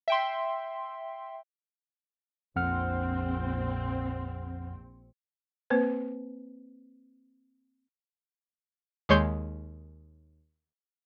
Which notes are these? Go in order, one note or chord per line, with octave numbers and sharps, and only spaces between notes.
E5 G5 C6
A#1 F2 C4 F#5 F6
A#3 C4 B4 C5
D#2 G#3 C#5 C6 G6